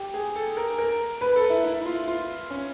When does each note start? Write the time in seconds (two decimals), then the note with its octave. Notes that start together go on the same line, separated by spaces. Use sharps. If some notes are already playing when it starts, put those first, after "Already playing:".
Already playing: G4
0.14 G#4
0.36 A4
0.57 A#4
0.79 A#4
1.21 B4
1.36 A4
1.50 E4
1.65 E4
1.86 F4
2.08 F4
2.51 C#4